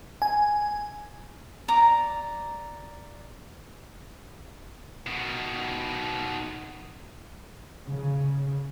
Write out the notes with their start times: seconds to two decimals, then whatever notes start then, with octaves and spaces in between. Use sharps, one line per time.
0.22 G#5
1.68 D5 A#5 D6
5.07 B2 D#3
7.86 C#3